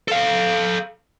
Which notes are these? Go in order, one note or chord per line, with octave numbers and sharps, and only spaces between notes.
A4 F5